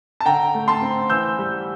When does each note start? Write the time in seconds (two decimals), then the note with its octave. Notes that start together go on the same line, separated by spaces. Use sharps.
0.20 A5
0.26 D3 G5 A#5
0.54 A3
0.68 A5 C6
0.82 C4
1.10 E3 E6 G6
1.38 G3